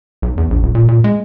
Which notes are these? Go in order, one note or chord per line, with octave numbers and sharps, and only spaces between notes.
B1
E2
A#1
D#1
A#2
A#2
G#3